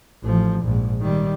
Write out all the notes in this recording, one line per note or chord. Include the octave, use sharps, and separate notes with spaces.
A1 F3
A#1 G#2
D#3 G3